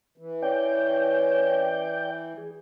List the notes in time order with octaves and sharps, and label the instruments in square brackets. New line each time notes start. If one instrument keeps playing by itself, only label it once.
[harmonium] E3
[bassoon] C#4 [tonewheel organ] D5 G5 G6
[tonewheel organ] G#4